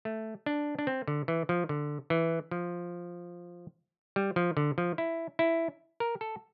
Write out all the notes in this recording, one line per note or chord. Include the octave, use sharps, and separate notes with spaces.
A3
D4
D4
C4
D3
E3
F3
D3
E3
F3
G3
F3
D3
F3
E4
E4
A#4
A4